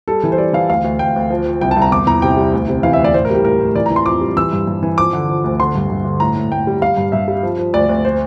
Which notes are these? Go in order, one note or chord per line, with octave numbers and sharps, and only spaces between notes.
G3 A4
E3
C5
G3 D5
E3 F5
D2 F5
D2
D2 G5
D2
F3
F3
C2 G5
A5
C2
A#5
E2 D6
E2 A#5
C3 G5
G3
D2
C3
E3 F5
E5
D2
D5
A2 C5
A#4
G3 G4
A2 A#4
A2
E3 D5
A#5
E3
C6
F2 D6
G3
E3 E6
G2
G2
E3
F3 D6
D3
F3
D2
D3 C6
G2
G2
D3
A2 A#5
A2
A2 G5
G3
G3 F5
G2
G2 E5
G3
F3
F3
D2 D5
D2
C5